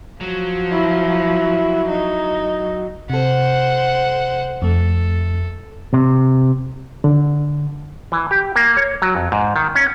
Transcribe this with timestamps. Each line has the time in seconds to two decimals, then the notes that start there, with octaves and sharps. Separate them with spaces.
0.21 F3 F#3
0.71 E4
1.88 D#4
3.10 C3 A4 C5 F#5
4.62 F2 A3 A4
5.94 C3
7.04 D3
8.12 E3
8.31 G4
8.56 A#3
8.77 C#5
9.02 F#3
9.15 F2
9.32 G#2
9.56 D#3
9.75 C#4